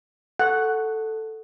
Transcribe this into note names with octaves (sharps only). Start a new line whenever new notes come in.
A4 F#5